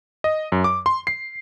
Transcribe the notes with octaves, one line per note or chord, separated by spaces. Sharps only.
D#5
F#2
D6
C6
C7